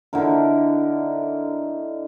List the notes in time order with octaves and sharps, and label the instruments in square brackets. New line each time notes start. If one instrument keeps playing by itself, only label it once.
[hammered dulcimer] D3 D#4 E4 A#4